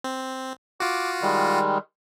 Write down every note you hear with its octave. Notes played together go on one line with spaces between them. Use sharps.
C4
F4 F#4 D6
D#3 G3 G#3